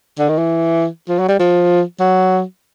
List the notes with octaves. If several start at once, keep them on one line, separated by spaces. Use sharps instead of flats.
D3
D#3
E3
F3
F#3
G3
F3
F#3